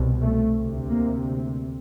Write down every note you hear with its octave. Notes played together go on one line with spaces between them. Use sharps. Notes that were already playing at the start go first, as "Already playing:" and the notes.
Already playing: C2 B2
A3
D2 C3
A#3